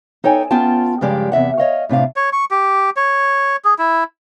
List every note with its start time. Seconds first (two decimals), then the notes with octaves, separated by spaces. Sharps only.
0.24 D#4 A4 C#5 G5 G#5
0.51 B3 C#4 F4 G5 A5
1.01 G2 C#3 F3 G#3 G4 D5
1.32 E2 C3 E5 F#5
1.58 C#5 D#5 F5
1.89 A2 C3 D4 F5
2.16 C#5
2.33 C#6
2.51 G4
2.96 C#5
3.65 G#4
3.78 E4